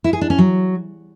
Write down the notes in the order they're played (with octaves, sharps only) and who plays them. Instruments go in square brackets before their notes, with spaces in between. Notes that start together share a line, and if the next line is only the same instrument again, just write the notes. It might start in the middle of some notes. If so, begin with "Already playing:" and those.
[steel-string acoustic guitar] E4
G#4
D4
C#4
F#3